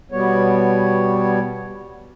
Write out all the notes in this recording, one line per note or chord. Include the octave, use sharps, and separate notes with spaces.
B2 G3 B3 C#5